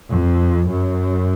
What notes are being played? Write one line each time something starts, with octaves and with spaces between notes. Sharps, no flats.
F2
F#2